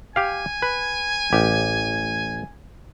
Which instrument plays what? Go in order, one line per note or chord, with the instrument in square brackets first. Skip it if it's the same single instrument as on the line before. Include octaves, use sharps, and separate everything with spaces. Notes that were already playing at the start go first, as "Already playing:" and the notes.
[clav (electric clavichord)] G4 F5 [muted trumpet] G#5
[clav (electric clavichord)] B4
A1 G4